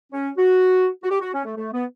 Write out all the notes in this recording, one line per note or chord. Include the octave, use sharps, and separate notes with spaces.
C#4
F#4
F#4
G4
F#4
C#4
A3
A3
B3